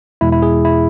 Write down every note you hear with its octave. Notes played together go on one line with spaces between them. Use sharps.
E2 B2 G#3 E4
E4
G#4
E4